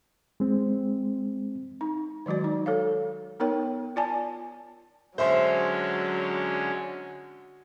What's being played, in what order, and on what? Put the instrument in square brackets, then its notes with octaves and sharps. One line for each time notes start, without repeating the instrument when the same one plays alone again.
[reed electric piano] G#3 C4
[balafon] D#4
D#3 F#3 G#3 F#4 D5
D#4
A4 C#5 F5
B3 D#4 A#4 C#5 G5
F4 D5 G#5 A5
[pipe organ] D3 G#3 C#4 [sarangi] F#3 [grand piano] C5 E5 C6